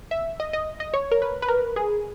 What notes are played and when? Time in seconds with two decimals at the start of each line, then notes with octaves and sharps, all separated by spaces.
0.11 E5
0.40 D#5
0.53 D#5
0.80 D#5
0.94 C#5
1.11 A#4
1.22 B4
1.42 B4
1.48 A#4
1.76 G#4